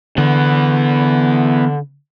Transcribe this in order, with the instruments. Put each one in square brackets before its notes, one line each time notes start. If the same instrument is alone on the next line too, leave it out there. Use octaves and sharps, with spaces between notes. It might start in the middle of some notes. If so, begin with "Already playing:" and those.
[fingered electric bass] D3 [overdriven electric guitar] E3 B3